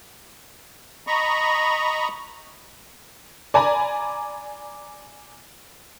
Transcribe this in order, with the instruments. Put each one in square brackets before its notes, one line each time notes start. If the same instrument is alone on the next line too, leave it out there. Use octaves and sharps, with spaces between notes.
[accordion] D#5 A#5 B5 C#6
[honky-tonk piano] D5 G#5 A#5 B5